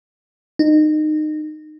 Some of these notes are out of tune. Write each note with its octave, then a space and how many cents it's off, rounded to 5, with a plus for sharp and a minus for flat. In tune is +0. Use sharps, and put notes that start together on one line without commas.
D#4 -25